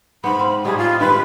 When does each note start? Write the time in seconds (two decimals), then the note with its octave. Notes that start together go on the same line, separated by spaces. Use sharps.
0.24 G#2 B3 B5
0.39 C4 F5
0.65 A2 G3 D#4 G#4
0.77 F4
1.00 G2 D#3 G#3 B4